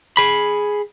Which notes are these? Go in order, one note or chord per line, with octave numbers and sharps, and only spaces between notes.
G#4 B5